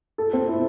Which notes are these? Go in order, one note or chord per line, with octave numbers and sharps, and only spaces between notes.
A4
C4
E4